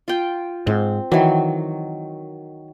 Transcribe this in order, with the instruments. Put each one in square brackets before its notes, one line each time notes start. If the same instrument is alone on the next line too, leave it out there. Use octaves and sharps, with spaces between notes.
[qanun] F4 G5
[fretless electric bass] G#2 [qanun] C4
[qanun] D#3 F#3 [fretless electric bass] E3